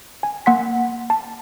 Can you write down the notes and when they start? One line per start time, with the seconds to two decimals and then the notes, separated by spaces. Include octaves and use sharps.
0.23 G#5
0.46 A#3 F#5 C6 B6
1.10 A5